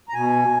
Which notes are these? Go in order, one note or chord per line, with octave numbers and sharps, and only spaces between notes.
A#5
B2 G#5